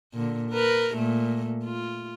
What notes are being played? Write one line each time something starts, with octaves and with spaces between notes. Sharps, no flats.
A#2 D3
A#4 B4
A#2 A3
F4